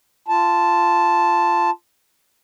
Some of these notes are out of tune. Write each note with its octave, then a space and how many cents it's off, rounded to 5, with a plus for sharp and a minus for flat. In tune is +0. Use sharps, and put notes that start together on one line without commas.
F4 -15 A5 +0